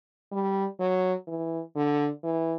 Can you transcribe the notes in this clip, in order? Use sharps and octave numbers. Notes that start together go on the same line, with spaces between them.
G3
F#3
E3
D3
E3